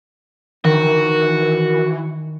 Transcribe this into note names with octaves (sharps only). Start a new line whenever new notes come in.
D#3 E3 F#4 A#4